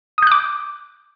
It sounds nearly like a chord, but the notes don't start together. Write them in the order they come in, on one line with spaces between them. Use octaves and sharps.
D#6 G6 F#6 D6